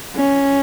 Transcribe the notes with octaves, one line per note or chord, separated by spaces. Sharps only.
C#4